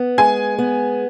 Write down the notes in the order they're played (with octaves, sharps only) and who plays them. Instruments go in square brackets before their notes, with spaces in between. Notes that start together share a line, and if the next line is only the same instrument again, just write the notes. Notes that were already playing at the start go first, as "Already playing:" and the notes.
Already playing: [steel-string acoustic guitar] B3
[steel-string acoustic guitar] G#3 [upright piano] G#5
[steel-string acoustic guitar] B3